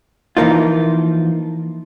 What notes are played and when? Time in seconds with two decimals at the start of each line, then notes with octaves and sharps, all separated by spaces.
0.37 E3 F3 A#3 D#4 F4